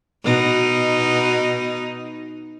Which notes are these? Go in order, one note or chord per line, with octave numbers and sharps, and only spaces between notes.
B2 D#4